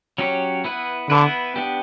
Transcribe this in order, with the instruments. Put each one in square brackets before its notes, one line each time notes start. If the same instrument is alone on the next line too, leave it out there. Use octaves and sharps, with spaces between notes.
[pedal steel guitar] F#3 C#4 G4 C#5
B3 E4 B4
[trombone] D3 [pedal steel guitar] B3 E4 B4
[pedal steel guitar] B3 D4 G4